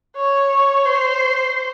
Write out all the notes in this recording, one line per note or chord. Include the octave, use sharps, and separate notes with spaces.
C#5
C5